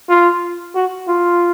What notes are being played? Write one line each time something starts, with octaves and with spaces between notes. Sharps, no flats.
F4
F#4
F4